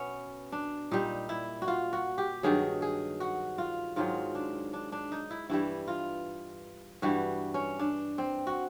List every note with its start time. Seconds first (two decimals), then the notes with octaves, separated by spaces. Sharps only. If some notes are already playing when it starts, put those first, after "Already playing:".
Already playing: B2 B3 C#4
0.52 D4
0.91 A#2 G3 D#4
1.29 E4
1.62 F#4
1.68 F4
1.93 F#4
2.18 G4
2.43 G2 D#3 F#3 G#4
2.82 G#4
3.20 F#4
3.58 F4
3.96 G#2 D#3 F#3 F4
4.35 D4
4.73 D4
4.92 D4
5.12 D#4
5.30 E4
5.49 G2 E3 G3 E4
5.88 F4
7.02 G2 E3 G3 F#4
7.54 C#4
7.79 D4
8.18 C4
8.47 F#4